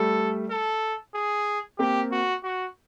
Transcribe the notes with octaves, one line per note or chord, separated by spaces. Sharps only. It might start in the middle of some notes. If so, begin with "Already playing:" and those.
Already playing: G3 A3 A4
A4
G#4
A#3 C4 G4
F#4
F#4